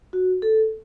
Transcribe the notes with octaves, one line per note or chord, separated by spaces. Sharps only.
F#4
A4